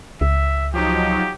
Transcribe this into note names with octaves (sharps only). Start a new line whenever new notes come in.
C#2 E5
F3 F#3 D#4 G4